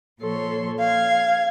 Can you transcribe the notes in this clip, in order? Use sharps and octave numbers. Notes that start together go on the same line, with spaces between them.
A#2 F3 A4 C#5 C6
F5 G#6